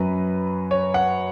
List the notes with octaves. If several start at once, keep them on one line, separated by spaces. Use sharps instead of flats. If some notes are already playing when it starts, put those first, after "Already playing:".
Already playing: F#2 F#3 B4
C#5
F#5